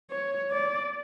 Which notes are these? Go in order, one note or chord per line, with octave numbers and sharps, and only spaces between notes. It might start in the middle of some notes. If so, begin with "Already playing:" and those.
C#5
D5